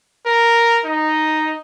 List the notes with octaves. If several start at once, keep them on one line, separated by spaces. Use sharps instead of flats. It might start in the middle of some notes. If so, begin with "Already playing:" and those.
A#4
D#4